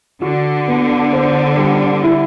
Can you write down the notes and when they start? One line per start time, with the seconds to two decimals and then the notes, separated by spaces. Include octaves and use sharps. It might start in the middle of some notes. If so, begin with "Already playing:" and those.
0.22 D3 F#4
0.68 B3
1.13 C5
1.57 G3
2.03 E4